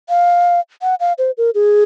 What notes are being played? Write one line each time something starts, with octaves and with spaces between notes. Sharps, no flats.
F5
F#5
F5
C5
A#4
G#4